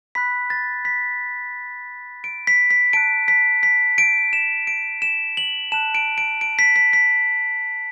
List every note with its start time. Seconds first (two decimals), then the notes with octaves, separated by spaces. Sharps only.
0.15 B5 F#6 B6
0.50 A6
0.85 B6
2.24 D7
2.47 B6
2.71 B6
2.93 A5 F#6 D7
3.28 B6
3.63 B6
3.98 D7
4.33 E7
4.67 D7
5.02 E7
5.37 F#7
5.72 A5 F#6 E7
5.95 D7
6.18 D7
6.41 D7
6.59 B6
6.76 B6
6.93 B6